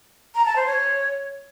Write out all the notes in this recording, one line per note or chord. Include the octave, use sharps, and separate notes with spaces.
A#5
A5
C5
C#5